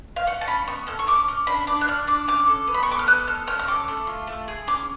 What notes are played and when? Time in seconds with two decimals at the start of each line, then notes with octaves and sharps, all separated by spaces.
0.16 F5
0.27 C#4 F#5
0.41 A5
0.48 C#4 B5
0.67 B3 C#6
0.87 A4 F6
0.99 C#6
1.07 C#4 D6
1.28 C#4
1.47 D4 B5
1.67 D4 D6
1.81 F#6
1.88 D4 F6
2.07 D4 D6
2.27 C#4 D6
2.47 A4
2.67 B3
2.74 B5
2.83 C#6
2.87 A4 D6
2.99 F6
3.07 B3 F#6
3.27 A4 F6
3.47 C#4 F6
3.59 F6
3.67 A4 D6
3.88 A3
4.07 F4
4.27 A3
4.48 G#4
4.67 C#4 D6